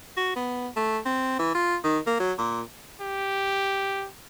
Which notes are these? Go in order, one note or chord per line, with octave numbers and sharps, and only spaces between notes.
F#4
B3
A3
C4
E3
F4
D#3
A#3
F#3
A#2
G4